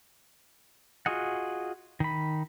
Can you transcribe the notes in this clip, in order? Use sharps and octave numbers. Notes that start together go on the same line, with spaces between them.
F4 F#4 G#4 D#5 F#5
D#3 B5